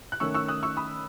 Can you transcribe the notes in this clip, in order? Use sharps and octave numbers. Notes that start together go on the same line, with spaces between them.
F#6
D#3 A3 C#4 C#6 E6
C#6 E6
D#6 F#6
C#6 E6
B5 D#6